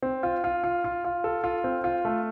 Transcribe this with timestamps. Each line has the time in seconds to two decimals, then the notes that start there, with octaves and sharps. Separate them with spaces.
0.02 C4
0.23 F4
0.44 F4
0.64 F4
0.84 F4
1.05 F4
1.24 A4
1.44 F4
1.64 C4
1.84 F4
2.05 A3